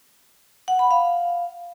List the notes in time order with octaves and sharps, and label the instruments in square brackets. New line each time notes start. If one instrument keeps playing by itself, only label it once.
[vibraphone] F#5
B5
F5